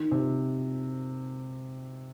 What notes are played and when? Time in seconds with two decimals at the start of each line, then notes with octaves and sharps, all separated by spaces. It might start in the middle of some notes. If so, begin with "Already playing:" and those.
Already playing: D#3
0.11 C3